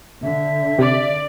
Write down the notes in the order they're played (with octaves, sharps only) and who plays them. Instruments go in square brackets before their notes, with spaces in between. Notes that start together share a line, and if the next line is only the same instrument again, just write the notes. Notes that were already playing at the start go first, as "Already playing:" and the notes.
[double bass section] D3 [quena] E5
[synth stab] C3 [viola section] D5